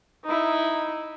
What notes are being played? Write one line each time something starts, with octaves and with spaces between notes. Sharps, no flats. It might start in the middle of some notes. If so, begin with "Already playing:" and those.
D#4 E4